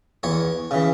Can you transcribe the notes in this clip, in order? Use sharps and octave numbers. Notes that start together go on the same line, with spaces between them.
E2 C#5
C#3 E3